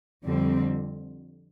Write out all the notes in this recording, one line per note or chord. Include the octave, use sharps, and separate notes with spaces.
F2 D3 G3 C4